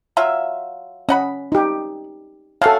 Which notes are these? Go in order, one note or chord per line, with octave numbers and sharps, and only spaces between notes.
F#3 F4 E5
C#4 D#5 F#5 B5
D#4 G4
F#3 A3 C#4 A4 F5